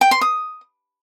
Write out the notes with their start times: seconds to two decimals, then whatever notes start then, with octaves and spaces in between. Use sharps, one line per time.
0.01 G5
0.11 C6
0.21 D#6